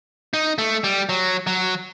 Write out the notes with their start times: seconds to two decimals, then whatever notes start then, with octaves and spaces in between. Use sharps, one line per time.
0.34 D#4
0.58 A3
0.84 G3
1.09 F#3
1.47 F#3